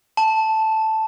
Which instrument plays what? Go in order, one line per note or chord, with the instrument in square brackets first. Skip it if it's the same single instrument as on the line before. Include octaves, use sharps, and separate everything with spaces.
[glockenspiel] A5